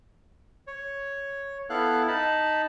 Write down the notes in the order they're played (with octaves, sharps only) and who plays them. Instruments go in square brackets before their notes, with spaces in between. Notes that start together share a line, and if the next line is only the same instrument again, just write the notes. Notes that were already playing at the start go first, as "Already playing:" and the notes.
[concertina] C#5
B3 E4 A4 F5 F#6
D#4 A5 B5